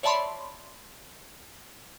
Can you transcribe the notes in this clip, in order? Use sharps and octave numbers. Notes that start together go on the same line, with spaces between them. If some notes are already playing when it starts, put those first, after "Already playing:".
C#5 D5 E5 A5 B5 C6